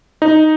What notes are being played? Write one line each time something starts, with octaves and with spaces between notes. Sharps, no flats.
D#4